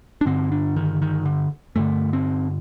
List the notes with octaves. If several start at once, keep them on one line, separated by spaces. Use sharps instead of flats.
D4
G2 D3 C4
D4
D#3
D#3
D3
G2 D3 A3
C4